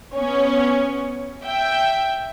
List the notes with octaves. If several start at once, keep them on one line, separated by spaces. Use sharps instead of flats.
B3 C#4 C#5
E5 G5